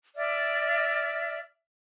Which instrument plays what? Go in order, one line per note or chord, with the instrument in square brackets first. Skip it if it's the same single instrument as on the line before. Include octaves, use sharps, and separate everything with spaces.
[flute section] D5 E5 F6